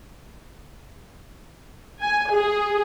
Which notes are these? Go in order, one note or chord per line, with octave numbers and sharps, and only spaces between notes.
G#5
G#4